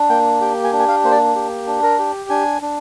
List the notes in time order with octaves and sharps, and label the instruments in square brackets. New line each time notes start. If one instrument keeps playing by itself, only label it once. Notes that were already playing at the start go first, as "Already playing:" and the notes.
Already playing: [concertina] D4
A#3 G5
G4 G5
G#5
D4
G#5
F5
A#3 C5
D5
G4
D4
A#4
G4
D4 G#5
D4